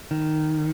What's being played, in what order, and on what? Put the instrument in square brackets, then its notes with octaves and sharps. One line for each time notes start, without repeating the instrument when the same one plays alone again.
[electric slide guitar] D#3